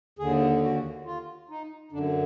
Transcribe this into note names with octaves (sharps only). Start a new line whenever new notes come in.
D#2 D3 G#4
F#4
F4
D#4
F#2 D3 D4